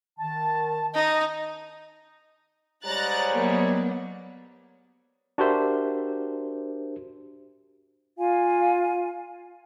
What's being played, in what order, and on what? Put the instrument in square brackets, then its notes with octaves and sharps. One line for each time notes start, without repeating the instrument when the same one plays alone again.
[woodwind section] D#3 A5
[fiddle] D#4 [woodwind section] D#5
[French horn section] G#2 G3 C#5 [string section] A#5 F#6 A6
[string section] F#3 A#3 B3
[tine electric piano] D4 F#4 G4 A#4 C5 E5
[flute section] F4 F5 G#5